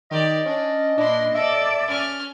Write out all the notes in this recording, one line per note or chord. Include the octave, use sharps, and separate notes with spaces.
D#3 G4 D5 D#5
C#4 D4
A#2 D4 E4 C6
A4 D5 E5
C#4 F6